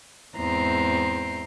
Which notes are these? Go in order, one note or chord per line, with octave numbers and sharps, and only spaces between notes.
E2 G#2 C4 A#5 C6